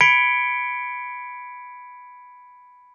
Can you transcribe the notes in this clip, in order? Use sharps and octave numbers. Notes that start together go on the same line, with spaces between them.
B5 G#6 B6 C#7 D7 G7